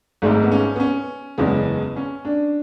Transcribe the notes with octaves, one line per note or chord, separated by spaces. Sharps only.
G#1 G#2 G#3 A3
B3
C#4
B3
C#4
F#1 E2 C#3 G#3 B3
C#4
D4